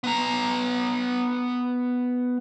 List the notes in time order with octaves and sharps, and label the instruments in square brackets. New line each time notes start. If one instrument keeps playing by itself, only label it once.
[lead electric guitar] B3 A#5